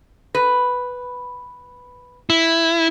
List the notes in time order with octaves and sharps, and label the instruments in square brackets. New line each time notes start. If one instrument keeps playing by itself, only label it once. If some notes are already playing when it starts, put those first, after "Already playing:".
[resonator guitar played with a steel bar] B4
[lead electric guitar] E4